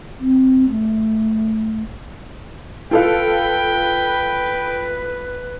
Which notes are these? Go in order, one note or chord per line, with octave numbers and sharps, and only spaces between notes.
C4
A3
F4 A4 B4 F5 G5